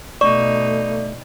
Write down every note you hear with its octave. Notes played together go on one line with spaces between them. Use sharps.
B2 A3 D#4 D5 C#6